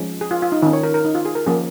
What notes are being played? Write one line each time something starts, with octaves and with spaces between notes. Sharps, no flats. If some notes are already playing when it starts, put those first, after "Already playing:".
Already playing: F3 G#3 C#4
G#4
F4
F4
D#4
D#3 C#4 D#4
C#5
A#4
A#4
D#4
F4
G#4
A#4
F3 A#3 C#4 G#4